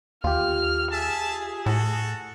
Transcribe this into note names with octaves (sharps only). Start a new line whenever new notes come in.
D#2 F4 G4 F6
G#4 E5 A5
A2 F#4 A4